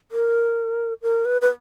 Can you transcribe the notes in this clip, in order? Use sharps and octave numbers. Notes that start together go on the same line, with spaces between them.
A#4
A#4
B4
B4